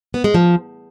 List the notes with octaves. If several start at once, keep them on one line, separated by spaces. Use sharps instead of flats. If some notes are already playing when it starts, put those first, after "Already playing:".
B3
G#3
F3